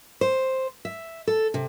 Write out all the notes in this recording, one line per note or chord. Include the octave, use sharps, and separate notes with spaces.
C5
E5
A4
C3